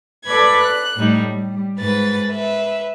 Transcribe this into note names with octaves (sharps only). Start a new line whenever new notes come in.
A4 B4 D5 B5 G#6
F#6
A2 G3 D#4
G3
G#2 B4 A6
B4 E5